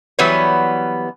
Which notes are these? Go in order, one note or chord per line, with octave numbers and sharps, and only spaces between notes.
E3 F#3 G3 B3 B4 C#5